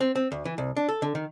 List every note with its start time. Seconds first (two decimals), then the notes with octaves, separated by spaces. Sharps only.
0.01 C4
0.16 C4
0.32 D2
0.45 E3
0.58 C2
0.77 D4
0.88 A4
1.02 D3
1.15 D#3